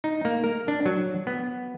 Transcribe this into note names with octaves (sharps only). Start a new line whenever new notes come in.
D#4
A#3
A#4
D4
F#3
B3